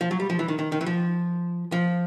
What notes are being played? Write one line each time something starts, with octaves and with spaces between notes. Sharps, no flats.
F3
F#3
G3
F3
E3
D#3
D#3
D#3
E3
F3
F3